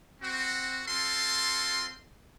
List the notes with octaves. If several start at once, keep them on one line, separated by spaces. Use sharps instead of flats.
C4 F#4
C4 F4 A4 C6